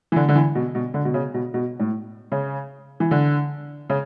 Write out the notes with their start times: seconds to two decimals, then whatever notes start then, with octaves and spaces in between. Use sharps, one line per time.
0.12 E3
0.16 D3
0.29 D3
0.35 E3
0.55 B2
0.75 B2
0.94 D3
1.05 B2
1.14 C#3
1.34 B2
1.54 B2
1.79 A2
2.32 C#3
3.00 E3
3.11 D3
3.90 C#3